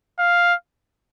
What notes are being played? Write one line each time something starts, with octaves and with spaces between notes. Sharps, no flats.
F5